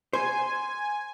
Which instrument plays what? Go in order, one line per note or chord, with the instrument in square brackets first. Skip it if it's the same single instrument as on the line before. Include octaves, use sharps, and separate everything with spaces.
[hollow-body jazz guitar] C5 [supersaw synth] G#5